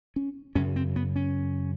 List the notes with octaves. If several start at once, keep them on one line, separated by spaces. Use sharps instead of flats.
C#4
F#2 C#3 C#4
C4
B3
C#4